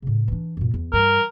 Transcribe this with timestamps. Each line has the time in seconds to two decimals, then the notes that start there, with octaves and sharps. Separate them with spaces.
0.02 A2 C#3
0.28 E3 D4
0.57 F#2 A#2
0.74 E2
0.93 G2 E3 A#4